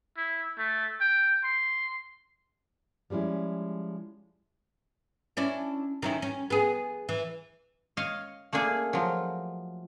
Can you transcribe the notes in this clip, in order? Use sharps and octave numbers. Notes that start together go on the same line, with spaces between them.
E4
A3
G5
C6
F3 G3 G#3 C#4 E4
C#4 D4 E4
D#3 C#4 E4
C#4
B3 G#4
E3
C#5 D#5 F5
A3 A#3 D4 G#4
F3 F#3